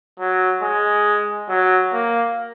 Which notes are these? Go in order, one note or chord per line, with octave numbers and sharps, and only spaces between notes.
F#3
G#3
F#3
A#3